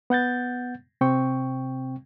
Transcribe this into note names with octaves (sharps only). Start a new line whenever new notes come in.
B3 F#5 G6 A6
C3 C4 G5 C#6